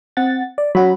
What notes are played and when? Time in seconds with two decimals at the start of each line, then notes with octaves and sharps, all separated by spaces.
0.17 C4 F#5 A6
0.58 D5
0.75 F#3 C#4 F#4 B5